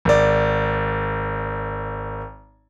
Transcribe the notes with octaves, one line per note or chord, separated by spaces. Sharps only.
G#1 D5